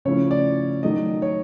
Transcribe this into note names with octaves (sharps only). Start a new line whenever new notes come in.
C#3 F3 A3 C#4 E4 C#5
D5
D#3 F#3 A3 D#5
C#5